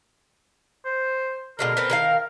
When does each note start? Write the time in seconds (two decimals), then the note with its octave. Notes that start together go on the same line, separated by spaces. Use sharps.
0.85 C5
1.59 B2 D3 G#3 A#4
1.77 B3 C4 A4
1.90 D#3 B4 F5